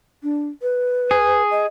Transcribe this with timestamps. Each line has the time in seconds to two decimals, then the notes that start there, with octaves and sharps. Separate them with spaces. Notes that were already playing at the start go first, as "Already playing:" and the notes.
0.23 D4
0.62 B4
1.11 G#4
1.51 D#5